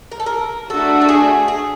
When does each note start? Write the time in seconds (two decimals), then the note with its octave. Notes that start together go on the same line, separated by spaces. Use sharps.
0.12 A#4
0.20 A4
0.26 A#4
0.69 A3 D4 F#4 A4
1.02 A4
1.09 G#4
1.48 G#4